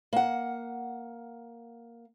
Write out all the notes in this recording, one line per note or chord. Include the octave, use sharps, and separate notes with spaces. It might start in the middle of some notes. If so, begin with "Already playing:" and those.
A#3 F#5